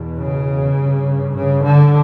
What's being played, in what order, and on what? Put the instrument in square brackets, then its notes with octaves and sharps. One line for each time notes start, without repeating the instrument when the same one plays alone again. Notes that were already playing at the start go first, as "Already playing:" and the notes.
Already playing: [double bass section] E2 B2
C#3
G2
C#3
D3